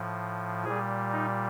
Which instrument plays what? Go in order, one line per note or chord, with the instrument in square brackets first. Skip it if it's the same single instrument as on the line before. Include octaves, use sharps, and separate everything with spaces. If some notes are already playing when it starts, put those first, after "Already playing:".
Already playing: [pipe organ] A2 F3
A#2 G3 G#4
D#4